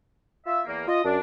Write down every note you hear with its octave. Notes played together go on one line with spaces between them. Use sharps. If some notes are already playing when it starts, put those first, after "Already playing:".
F4 E5
E2 A#3
F4 D#5
F#2 D4